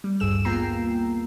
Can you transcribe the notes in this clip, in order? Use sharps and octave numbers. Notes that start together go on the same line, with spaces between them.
G3
A1 D2 G2 G#4 E6 E7
A#3 B3 F4 G5 A#5 C7